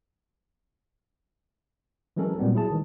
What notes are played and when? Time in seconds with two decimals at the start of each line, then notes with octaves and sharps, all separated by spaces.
2.17 E3 F#3 G#3 C#4 A4 A#4
2.39 A#2 F#3 G3 B3 C4
2.54 F#3 E4 G#4 A5
2.71 D#3 E3 G#3